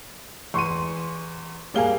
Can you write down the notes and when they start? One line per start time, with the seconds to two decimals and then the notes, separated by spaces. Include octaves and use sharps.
0.54 E2 C6 C#6 D#7
1.74 G3 A#3 G#4 F5 G#5 G7